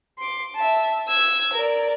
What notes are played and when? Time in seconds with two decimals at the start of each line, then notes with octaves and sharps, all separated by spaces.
0.18 C6 D6
0.56 E5 A5
1.08 E6 G#6
1.54 A#4 D5